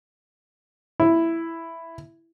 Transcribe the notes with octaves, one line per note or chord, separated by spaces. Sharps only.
E4